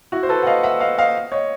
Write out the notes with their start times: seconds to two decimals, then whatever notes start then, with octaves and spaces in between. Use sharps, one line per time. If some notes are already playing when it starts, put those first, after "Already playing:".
0.12 E4 F#4
0.23 C5
0.29 A4 B4
0.43 F#5
0.47 D#5 F5
0.63 E5 F#5
0.80 D#5 F5
0.98 D#5 F5
1.32 C#5 D#5